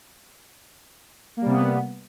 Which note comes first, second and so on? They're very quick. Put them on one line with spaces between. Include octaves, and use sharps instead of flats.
A#3 G3 C3 B3